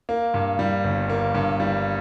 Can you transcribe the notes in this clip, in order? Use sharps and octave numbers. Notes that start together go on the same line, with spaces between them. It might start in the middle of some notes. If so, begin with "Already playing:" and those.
A#3
G2
G3
G1
A#3
G2
G3